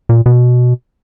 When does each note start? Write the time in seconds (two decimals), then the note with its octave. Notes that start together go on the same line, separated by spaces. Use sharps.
0.09 A#2
0.26 B2